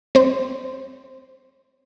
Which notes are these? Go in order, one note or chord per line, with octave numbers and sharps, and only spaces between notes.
C4 C5